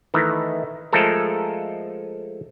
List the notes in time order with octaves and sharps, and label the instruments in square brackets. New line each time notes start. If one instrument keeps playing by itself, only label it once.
[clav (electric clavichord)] D#3 E3 A3 D#4 E4
F3 G#3 A3 A4 A#4